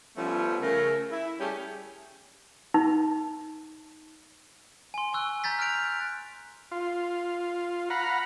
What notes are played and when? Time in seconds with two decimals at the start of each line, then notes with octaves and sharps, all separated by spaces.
0.17 F3 G3 A3 B3 C#4
0.62 C#3 A3 A#4
1.11 E4
1.40 G3 A3 C#4 G4 G#4 C#5
2.74 D#4
4.94 G#5 C6
5.13 G#5 C#6 E6 F#6
5.44 A#5 G6 A6 B6
5.59 F6 F#6 B6 D7 F7
6.72 F4
7.90 F5 F#5 A#5 B5